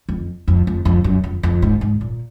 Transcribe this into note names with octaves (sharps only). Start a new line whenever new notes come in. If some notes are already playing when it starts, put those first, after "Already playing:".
F2
F2
F2
F2
F#2
F2
F2
G#2
G#2
A#2